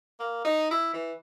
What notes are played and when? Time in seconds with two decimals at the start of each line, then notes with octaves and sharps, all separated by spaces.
0.20 A#3
0.45 D#4
0.71 E4
0.93 E3